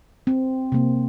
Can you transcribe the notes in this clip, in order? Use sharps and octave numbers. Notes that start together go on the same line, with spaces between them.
C4
C3 A#3